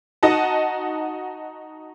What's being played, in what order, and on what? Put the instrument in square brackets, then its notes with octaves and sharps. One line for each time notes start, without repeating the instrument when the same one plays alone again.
[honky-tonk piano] D#4 F#4 D#5 F#5 A5